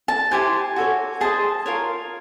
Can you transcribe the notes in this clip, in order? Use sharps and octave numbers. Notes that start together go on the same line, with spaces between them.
A5
E4 G4 C5 G#5
F#4 A4 C#5
G#4 C5 D#5 A5
F4 A#4 C#5